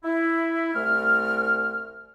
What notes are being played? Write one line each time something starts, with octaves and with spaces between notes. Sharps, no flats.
E4
C2 A3 F6